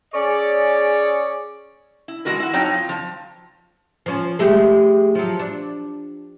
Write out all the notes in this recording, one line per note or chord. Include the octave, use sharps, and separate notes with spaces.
C#4 G#4 C#5 D5
E4
E3 G#3 F#4 A#4 B4
E4 F#4
F2 F#3 D#4 C#5 G5
F4
G2 F3
F3 C#4
G#3 A3 G4
F3 F#3
D4